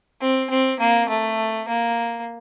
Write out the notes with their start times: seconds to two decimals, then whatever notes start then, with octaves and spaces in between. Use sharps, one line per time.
0.21 C4
0.50 C4
0.80 A#3
1.09 A3
1.68 A#3